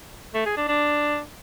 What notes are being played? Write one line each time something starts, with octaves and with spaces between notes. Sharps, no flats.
A3
G#4
D4
D4